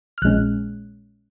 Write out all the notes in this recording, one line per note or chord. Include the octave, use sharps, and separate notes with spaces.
F6
A#1 A#2 G#3 C#4 F#6